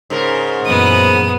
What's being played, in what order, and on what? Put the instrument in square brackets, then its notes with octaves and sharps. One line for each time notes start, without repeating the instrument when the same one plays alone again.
[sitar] G#2 C#3 A#4
[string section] F#2 A#2 E3 [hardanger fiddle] B3 D#6